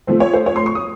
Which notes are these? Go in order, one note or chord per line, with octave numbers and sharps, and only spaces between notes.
F3 A3 C4
C#5
C5
C#5
C6
C#6
D#6